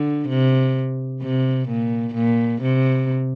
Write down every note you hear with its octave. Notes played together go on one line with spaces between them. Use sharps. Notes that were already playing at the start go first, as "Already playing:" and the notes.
Already playing: D3
C3
C3
A#2
A#2
C3